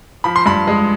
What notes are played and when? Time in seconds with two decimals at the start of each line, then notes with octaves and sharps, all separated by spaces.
0.24 F3 B5
0.36 C6
0.46 G2 B5
0.67 G#3